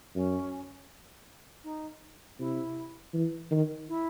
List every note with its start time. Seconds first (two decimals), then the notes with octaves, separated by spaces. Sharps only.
0.15 F#2 C#4
1.64 D#4
2.39 C3 E4
3.14 E3
3.51 D#3
3.88 E4